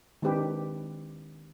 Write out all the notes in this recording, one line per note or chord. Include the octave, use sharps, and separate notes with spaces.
D#3 G#3 C4 D4 G4 B4